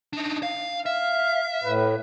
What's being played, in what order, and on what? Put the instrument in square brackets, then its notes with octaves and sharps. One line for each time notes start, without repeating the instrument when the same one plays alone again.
[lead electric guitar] D4 D#4
F5
[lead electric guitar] E5 [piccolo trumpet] F5
[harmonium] A2 [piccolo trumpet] B4